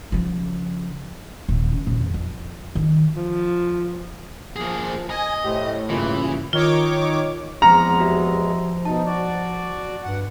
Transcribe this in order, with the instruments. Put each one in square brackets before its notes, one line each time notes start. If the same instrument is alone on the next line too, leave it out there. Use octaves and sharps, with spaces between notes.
[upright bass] C#3 F3
D#1
C#3
D#1
E2
F2
D#3
[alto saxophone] F3
[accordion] F3 [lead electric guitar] A#3 G#4
[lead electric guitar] D#5 [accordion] G#5
[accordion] A2 A3 [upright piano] G4 C5
[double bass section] G2 C#3 [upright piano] A#2 [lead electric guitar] E3
[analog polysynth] D#3 C#5 D6 [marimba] F4
[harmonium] E2 G#3 [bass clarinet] F3 [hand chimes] C4 F6 C#7 [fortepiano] A#5
[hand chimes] F#4 G4 E5
[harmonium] B2 D#4 [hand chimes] A5
[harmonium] F#4 D5
[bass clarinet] G2 [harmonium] F#5